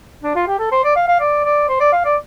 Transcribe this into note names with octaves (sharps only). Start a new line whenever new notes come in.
D4
F4
G4
A4
C5
D5
F5
F5
D5
D5
C5
D5
F5
D5